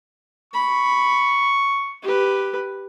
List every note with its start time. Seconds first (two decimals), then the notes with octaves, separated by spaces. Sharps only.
0.54 B5 C#6
2.03 G4 B4